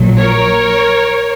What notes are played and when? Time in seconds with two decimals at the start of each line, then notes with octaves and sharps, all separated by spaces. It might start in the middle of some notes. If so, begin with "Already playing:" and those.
Already playing: A#1 A#2 F#3
0.18 A#4 C#5